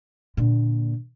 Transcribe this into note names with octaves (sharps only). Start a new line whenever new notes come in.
A#2 D3